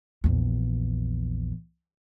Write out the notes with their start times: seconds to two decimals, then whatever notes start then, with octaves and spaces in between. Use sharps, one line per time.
0.24 A#1 E2